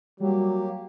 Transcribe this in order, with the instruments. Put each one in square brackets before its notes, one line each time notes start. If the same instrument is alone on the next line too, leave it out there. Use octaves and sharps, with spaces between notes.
[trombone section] F#3 [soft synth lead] G3 [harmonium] A#3 G4